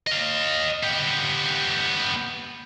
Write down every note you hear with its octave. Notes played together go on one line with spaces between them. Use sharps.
D#5 F5
B3 G4